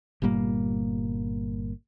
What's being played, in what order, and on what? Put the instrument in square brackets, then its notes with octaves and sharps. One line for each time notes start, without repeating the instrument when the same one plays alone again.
[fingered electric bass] G1 A#2 G3 A#3